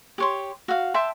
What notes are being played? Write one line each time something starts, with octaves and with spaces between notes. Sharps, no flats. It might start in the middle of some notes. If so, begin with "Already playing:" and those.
G4 C#5 C6
F#4 F5
E5 G5 A5 C6